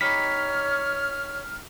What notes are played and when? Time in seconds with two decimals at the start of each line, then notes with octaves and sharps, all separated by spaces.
0.01 D#4 G4 C#5 B5 F6 B6